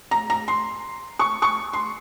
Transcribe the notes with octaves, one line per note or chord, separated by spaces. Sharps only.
A#5
A#5
C6
C#6
C#6
C6